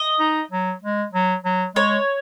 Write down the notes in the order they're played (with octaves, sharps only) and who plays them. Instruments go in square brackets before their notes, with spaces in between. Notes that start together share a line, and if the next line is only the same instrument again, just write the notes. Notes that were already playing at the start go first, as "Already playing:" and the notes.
Already playing: [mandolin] D#5
[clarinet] D#4
F#3
G#3
F#3
F#3
[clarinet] G#3 [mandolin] C#5